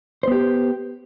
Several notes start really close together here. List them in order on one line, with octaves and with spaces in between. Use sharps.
C5 B3 G4